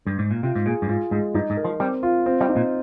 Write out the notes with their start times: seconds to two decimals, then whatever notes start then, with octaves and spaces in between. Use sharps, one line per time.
0.07 G2
0.19 G#2
0.31 A#2
0.43 C3 F4
0.55 G#2
0.66 A#2 G#4
0.82 G2
0.89 G#2 F4
1.11 G#2 G#3
1.34 G2 D#4
1.50 G#2
1.57 A#4
1.65 F3
1.80 G3 C4
2.03 F4
2.26 C4
2.41 G3
2.49 D#4
2.56 A#2